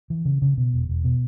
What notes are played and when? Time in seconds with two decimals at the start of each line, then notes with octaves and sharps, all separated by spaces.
0.10 E3
0.25 C#3
0.42 C#3
0.57 B2
0.74 E1
0.89 E1
1.04 B2